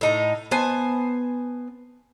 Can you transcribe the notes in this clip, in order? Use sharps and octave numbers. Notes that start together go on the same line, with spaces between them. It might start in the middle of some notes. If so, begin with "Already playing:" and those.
A2 D#4 A#5
B3 C5 G#5 A5